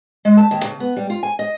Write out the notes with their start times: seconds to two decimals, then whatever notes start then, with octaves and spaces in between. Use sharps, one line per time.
0.25 G#3
0.37 A5
0.51 D#2
0.64 C#3
0.80 B3
0.97 G3
1.10 F4
1.23 G#5
1.39 D#5